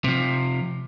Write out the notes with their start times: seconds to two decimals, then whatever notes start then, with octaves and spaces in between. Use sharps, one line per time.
0.04 C3 F3